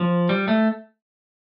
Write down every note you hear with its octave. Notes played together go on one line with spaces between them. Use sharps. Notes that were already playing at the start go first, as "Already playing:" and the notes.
Already playing: F3
G3
A3